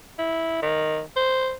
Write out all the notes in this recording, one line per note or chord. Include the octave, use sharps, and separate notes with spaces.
E4
D#3
C5